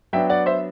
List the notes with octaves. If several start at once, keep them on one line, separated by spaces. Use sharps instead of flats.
F#3 B3 D4 E5 G5
D5 F#5
C5 E5